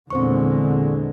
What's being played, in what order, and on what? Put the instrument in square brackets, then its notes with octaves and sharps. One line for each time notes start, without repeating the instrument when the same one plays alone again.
[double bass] E2 A#2 [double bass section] D3 G#3 [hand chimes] C4 C5 C#6